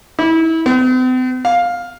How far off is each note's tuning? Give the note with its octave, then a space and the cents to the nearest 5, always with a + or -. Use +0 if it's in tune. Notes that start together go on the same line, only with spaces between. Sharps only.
E4 -25
C4 -45
F5 +10